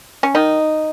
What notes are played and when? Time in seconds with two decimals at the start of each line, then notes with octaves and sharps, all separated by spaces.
0.23 C#4
0.35 D#3 D#4